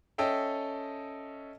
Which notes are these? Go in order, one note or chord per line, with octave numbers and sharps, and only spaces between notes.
C#4 A4 D#5 E5 G5